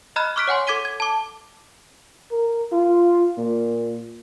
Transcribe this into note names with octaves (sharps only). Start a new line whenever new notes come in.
D#5 A#5 B5 F6 F#6 G#6
C#6 D6 F6 F#6 B6 D7
C#5 F#5 G#5 C6
A4 D6 G#6 B6 D#7 G7
G#6
A5 D6
A#4
F4
A#2